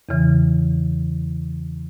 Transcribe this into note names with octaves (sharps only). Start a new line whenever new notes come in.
E2 C#3 E3